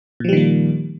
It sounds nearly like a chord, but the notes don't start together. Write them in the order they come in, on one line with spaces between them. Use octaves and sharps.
A#2 F3 G3 D#3 A#3